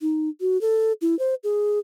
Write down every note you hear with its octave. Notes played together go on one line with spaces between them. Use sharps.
D#4
F#4
A4
E4
C5
G#4